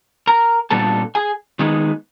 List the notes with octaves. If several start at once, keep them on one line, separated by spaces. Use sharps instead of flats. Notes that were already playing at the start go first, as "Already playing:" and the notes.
A#4 A#5
A#2 G3 B3 D4 A4 A5
G#4 G#5
D#3 G#3 B3 D#4